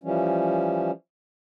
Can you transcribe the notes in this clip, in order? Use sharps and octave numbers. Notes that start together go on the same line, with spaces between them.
E3 F3 G3 C#4